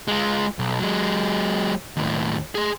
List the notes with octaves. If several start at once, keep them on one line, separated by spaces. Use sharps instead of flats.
G#3 F4
B1
F#3 G#3
D#2 A2
G#4 C6